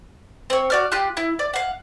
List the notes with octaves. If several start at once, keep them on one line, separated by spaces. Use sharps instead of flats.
C4 C#5
F#4 D5 F6
F4 G4 C6 F#6
E4
D5
F5 F#5